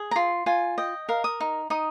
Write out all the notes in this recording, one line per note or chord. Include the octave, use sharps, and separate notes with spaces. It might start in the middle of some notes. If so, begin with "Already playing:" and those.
Already playing: G#4
A#5
F4 C6
F4 G#5
D#5 G5
A#4 F5
D#6
D#4
D#4 D#6